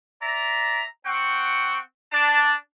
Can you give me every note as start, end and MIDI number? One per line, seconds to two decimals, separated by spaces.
0.22 0.84 74
0.22 0.84 76
0.22 0.84 82
1.06 1.80 60
1.06 1.80 78
1.06 1.80 79
1.06 1.80 85
2.12 2.55 62
2.12 2.55 81